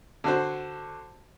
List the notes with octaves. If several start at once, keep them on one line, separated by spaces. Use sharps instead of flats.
D3 F#4 C5